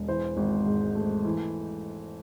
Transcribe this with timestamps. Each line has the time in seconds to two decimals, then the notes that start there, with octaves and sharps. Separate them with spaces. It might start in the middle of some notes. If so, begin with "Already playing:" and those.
Already playing: E1 G#3
0.08 E3 C5
0.37 G#1
0.66 G#2
0.95 A3
1.25 E3